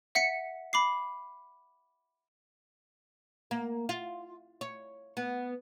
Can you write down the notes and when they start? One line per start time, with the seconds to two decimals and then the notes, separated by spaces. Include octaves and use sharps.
0.15 E5 F#5 B6 C#7
0.73 B5 D6 C7
3.51 A#3
3.89 F4
4.61 C#5
5.17 B3